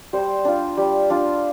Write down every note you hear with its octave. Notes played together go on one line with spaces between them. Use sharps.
G3 C5
D4 F4
G3
D4 F4